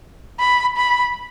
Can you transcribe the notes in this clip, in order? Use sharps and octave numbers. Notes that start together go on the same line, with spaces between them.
B5
B5